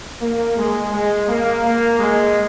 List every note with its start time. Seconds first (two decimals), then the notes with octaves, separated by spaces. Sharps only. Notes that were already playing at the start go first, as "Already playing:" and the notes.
0.21 A#3
0.56 G#3
0.92 G#3
1.28 A#3
1.64 A#3
1.99 G#3